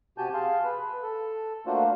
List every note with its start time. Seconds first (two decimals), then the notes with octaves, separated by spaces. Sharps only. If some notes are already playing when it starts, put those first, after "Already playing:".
0.18 C3 F#4 G4 G#5 A5 G6
0.34 G#4 F5 A5 C6
0.64 B4
1.02 A4
1.66 A3 A#3 D4 F4 F#4 C5